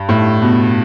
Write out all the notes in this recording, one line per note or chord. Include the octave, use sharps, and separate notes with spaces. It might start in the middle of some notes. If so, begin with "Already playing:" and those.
Already playing: G2
A2
B2